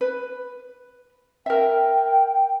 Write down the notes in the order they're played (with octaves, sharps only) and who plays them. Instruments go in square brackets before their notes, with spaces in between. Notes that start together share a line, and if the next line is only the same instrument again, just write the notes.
[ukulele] B4
[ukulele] A#4 E5 [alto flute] G5